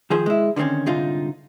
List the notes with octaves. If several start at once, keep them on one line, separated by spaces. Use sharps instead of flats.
D#3 F3 G#4 C5
G#3 E4
D3 D#3 A3 C4 C#4
C2 G#2 D3 C4 D#4 F4